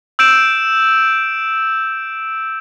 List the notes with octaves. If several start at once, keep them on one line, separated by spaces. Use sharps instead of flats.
E6 G6 D7 E7